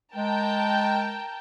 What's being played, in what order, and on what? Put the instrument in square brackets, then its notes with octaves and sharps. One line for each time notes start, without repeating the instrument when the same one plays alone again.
[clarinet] G#3 [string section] A#4 G5 A5